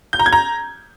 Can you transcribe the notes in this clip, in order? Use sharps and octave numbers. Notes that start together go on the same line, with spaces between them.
G6
A#5
G#6
A#5